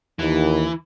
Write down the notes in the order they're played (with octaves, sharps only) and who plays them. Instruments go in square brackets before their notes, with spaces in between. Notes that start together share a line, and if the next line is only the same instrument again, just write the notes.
[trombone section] D#2 [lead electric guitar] E3